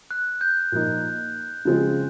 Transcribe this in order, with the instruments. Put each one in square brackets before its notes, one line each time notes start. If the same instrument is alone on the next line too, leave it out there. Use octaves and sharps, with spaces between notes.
[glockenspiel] F#6
G6
[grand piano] A#2 F3 A#3 D#4
C#3 F3 G#3 C4 F4